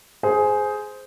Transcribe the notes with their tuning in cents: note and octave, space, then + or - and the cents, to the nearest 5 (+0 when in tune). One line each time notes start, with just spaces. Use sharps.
G#4 +15 C5 -5